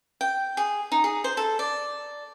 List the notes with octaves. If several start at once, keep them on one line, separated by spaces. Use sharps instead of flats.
G5
G#4
D#4
G#4
C5
A4
D5